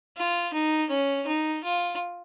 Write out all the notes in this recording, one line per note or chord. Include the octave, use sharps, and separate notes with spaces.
F4
D#4
C#4
D#4
F4